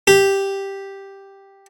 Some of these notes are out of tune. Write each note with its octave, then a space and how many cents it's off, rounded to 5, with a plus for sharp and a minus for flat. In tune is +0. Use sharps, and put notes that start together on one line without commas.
G4 +0